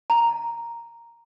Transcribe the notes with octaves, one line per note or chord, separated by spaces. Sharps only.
A#5